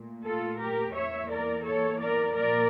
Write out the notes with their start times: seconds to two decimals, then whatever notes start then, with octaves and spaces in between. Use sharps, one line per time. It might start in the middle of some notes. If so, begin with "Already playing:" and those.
Already playing: A#2 A3
0.25 F4 A4
0.60 G4 A#4
0.95 E2 E3 A#3 C#5 E5
1.31 A#4 D5
1.66 A4 C#5
2.01 A#4 D5
2.36 A#2 F3 A#3 A#4 D5